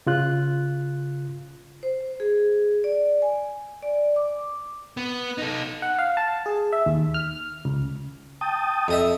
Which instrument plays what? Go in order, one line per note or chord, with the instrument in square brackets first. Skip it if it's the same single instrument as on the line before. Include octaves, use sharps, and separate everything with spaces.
[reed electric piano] C#3 F4 F#6
[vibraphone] C5
G#4
D5
G#5
D5
D6
[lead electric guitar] B3
D#4 A4
[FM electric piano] F#5
F5
A5
G#4
E5
D#2
F6
C#2
[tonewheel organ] G5 A5 D#6
[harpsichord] F2 D#5 E5